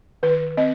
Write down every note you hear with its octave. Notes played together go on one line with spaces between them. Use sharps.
D#3 B4
C4 D#5